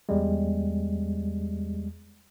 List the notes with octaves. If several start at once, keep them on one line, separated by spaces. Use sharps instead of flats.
E2 G3 G#3